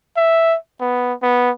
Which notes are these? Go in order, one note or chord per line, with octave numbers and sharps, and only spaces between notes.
E5
B3
B3